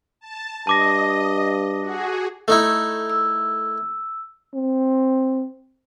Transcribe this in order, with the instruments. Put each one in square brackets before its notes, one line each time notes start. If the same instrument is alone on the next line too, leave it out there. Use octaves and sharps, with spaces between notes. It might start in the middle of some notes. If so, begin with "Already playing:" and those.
[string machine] A5
[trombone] G2 [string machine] D#5 [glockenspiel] A5 D6 A#6
[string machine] F#4 G#4
[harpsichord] A3 D#4 E4
[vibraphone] E6
[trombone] C4